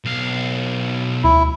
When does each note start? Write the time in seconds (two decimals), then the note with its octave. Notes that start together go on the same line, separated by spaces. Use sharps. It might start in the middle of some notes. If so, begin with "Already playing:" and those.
0.05 B1 F5
1.24 D2 E4